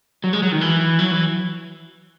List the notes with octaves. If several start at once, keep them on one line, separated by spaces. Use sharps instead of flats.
F#3
G#3
F#3
D#3
E3
F#3
E3